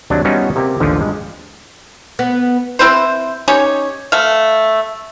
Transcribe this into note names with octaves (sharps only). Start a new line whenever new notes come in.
D#2 C3 F#3 D4
G3 B3 C#4 D#4 F4 F#4
C3 A#3 G4
A1 D#2 D3 F3
G2 G#3
B3
C4 E4 B4 C5
C#4 D#4 G4 C#5
A3 F5